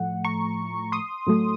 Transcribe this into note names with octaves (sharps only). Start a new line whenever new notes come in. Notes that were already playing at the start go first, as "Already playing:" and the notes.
Already playing: A2 F3 A3 F#5
A#5 C#6
C6 D#6
A2 F#3 A3